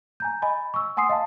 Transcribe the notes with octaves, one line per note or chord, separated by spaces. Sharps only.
G#5 A#5 G6
D#5 G#5 B5
C#6 E6
F#5 G#5 C6 D#6 C7
D#5 F5 A5